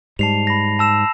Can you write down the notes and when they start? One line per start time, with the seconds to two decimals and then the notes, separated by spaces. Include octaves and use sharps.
0.19 G#2 G3 A5 C7 F7
0.47 B5 A#6
0.79 A5 E6 E7